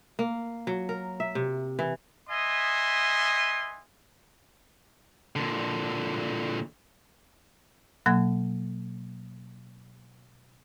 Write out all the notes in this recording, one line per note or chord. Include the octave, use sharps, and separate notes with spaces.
A#3
F#3
A#4
E5
C3
E3
B3 D#5 E5 G#5 C6 D#6
A#2 D3
B2 F#3 A#3 F#5 G#6